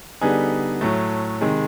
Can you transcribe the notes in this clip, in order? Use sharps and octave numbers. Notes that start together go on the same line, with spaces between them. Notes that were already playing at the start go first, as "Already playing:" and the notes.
D3 G3 B3 D#4 G#4
A2 F#3 A3
C3 D#3 G#3